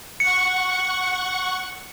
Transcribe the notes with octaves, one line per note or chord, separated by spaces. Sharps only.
F#5 C#6 C#7